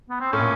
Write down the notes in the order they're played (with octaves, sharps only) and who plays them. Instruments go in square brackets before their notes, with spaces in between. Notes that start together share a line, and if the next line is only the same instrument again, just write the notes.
[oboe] B3
C4
[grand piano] A2 [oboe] C#4
[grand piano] A#2